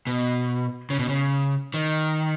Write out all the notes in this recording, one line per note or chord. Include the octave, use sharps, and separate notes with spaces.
B2
C#3
B2
C#3
D#3